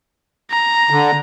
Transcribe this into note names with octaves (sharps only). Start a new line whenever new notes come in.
A#5
D3